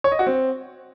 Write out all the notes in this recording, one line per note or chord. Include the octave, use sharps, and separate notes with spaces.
C#5
D#5
F#4
C4